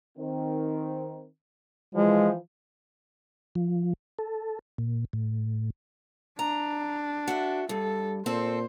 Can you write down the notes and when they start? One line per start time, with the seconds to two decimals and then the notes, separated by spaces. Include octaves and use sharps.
0.18 D#3 C4
1.95 E3 F3 G#3
3.55 F3
4.19 A4
4.78 A#2
5.13 A2
6.39 D4 A#5
7.28 F#4 A4 E5
7.69 G2 G3 A4
8.26 A#2 C4 A4 C5